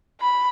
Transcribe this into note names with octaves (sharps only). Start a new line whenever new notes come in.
B5